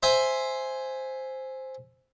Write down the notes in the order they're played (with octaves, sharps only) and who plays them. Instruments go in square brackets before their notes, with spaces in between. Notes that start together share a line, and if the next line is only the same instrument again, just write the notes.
[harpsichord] C5 E5 G#5